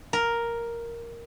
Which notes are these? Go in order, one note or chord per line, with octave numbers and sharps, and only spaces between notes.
A#4